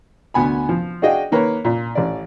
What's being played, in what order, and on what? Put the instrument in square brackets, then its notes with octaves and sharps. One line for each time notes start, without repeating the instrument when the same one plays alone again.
[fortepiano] D2 B3 G#5 B5
F3
D4 F#4 G#4 D#5 F5 G5
D#3 A#3 A#4 B4 C#5
A#2
A1 D5